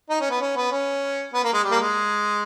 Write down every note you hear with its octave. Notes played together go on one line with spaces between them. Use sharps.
D#4
C#4
B3
C#4
B3
C#4
B3
A#3
G#3
G3
A#3
G#3